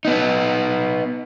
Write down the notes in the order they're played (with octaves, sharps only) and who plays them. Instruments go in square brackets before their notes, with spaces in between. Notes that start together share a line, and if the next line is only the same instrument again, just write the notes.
[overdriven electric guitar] B3 D#4